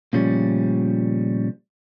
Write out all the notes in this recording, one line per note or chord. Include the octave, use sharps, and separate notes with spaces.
A#2 C#3 F3 G3 A3 C#4